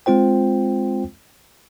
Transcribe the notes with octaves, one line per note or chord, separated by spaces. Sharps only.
G#3 C4 F4 C5 G5